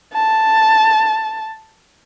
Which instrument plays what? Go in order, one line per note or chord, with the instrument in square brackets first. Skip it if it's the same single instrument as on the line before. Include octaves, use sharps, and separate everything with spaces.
[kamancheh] A5